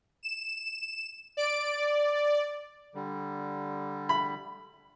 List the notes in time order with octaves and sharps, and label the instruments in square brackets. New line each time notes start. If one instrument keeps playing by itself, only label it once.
[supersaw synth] E7
D5 D7
D5
[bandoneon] D3 G3
[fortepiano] B5